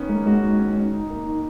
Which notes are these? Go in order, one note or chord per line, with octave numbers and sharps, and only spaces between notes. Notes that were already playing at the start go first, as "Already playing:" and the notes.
Already playing: D#3 B3 C#4
G#3 A#3
G#3 F#4
D#3
C#4
D#3
D#4
A#3
D#3